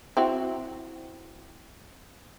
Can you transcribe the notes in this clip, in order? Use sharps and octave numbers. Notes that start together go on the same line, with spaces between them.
C4 E4 F#4